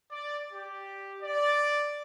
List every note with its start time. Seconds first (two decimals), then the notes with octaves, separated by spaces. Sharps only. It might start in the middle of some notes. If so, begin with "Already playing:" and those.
0.11 D5
0.53 G4
1.22 D5